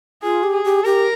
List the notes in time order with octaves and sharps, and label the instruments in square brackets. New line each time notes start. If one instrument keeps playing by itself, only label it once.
[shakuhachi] F4 [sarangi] G#4
[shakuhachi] G4
[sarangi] G#4
[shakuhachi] G4
[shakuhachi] G4 [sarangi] A#4